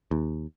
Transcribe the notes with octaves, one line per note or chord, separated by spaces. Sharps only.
D#2